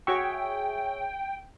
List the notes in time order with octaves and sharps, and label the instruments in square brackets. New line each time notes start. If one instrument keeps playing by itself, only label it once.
[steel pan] F#4 C#6 [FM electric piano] G#4 C#5 E5 [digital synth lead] G5